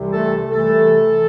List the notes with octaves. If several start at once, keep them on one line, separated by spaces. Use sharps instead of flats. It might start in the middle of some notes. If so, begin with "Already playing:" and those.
Already playing: C2 C3 E3
A3 A4
C2 C3 E3 A3 A4
E3